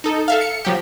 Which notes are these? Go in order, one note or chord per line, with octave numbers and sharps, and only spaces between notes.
D#4 A4
A4 E5 F5
C#7
F3 F#3 G4